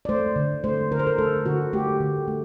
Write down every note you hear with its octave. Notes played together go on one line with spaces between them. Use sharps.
D5
A3 C5
D3
A3 C5
D3 A#4
C5
A#4
A3 A4
D3 F#4
A3 G4
D3
A3